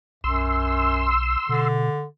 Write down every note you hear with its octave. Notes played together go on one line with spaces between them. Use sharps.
B1 F#2 C6 E6
B2 D3